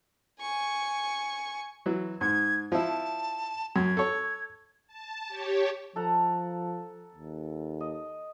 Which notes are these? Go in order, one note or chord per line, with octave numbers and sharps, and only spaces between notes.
G#5 C#6
E3 F#3
G#2 G#6
F3 E4 A5
F#2 G#6
A4 C#5
A5
G4 C#5
F3 A4 F#5 A#5
D#2
D#5